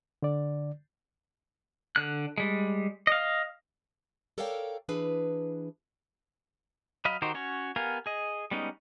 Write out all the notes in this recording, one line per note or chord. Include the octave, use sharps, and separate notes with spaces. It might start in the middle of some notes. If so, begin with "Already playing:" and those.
D3 D5
D3 F#6
G3 G#3
D#5 F5
A4 A#4 C#5 D5 F5 G5
E3 D4 G#4 B4
F#3 D#5 F5 B5
D#3 D#4 F#4 G4 C5
C#4 F#4 C#5
B3 G4 A#4 F5 G#5
G#4 D#5
G3 G#3 B3 C#4 D#4